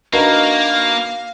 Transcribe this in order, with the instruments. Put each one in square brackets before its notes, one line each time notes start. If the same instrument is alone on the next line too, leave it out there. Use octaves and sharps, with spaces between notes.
[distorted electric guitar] A#3 [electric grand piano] D4 F#4 C7 [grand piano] D#4 A#4 B4 [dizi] F5